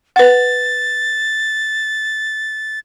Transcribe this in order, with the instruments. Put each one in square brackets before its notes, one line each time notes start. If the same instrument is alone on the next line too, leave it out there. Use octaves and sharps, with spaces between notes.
[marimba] B4 F#5 [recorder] A6